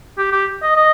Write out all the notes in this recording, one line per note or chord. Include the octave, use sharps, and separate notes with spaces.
G4
G4
D#5
D#5